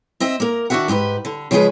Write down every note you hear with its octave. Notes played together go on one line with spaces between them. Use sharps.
C4 D#5 E5
A#3 A#4
D#3 D4 F#4 G#4 E5 F#5
G#2 G4 G#4 B4
D3
C#3 F3 G#3 F#4 G#4 B4